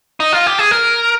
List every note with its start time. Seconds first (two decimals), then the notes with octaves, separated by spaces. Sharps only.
0.20 D#4
0.33 F4
0.46 G4
0.59 G#4
0.71 A#4